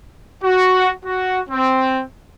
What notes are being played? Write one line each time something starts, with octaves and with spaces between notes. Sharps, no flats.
F#4
F#4
C4